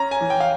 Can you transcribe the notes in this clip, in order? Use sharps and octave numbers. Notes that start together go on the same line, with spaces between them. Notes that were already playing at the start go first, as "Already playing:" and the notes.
Already playing: C#4 A#5
G#5
E3
G5
F5